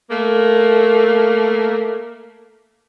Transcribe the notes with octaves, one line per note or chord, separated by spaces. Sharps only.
A3 A#3